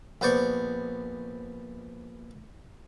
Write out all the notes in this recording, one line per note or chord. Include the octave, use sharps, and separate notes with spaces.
A#1 B3 C5 D5 C#6